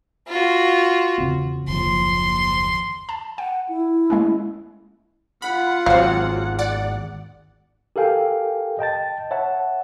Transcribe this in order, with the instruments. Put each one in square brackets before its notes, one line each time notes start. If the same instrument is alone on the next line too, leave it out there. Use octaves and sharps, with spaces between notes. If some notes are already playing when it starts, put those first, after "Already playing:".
[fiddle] F4 F#4
[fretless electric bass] E2 C#3 C4
[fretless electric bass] F#1 D#2 F3 [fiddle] C6
[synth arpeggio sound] A5
[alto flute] F#5 [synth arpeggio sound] G5
[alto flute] E4
[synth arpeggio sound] G#3 A#3 C#4
[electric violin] F4 F#5 [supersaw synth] B5
[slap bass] G#1 E2 [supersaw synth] F#3 C4 [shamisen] F5
[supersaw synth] D5 F#5
[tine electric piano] G4 A4 A#4 F5 G5 G#5
D#5 G5 A5 A6
C#5 E5 F#5 A5